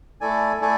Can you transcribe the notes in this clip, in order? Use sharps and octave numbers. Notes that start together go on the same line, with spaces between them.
A3 E4 A4 D5 G#5
A3 E4 A4 D5 G#5